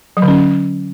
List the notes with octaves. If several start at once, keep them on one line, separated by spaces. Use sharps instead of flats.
F#3
D3
C#4